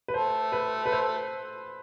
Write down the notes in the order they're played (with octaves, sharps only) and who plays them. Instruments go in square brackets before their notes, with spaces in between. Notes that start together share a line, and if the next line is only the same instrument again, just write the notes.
[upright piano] B4
[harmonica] A3 [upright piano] C5
[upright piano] B4
B4
C5